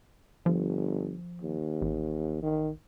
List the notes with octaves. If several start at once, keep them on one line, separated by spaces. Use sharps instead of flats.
G1 F3
D#2
A1
D#3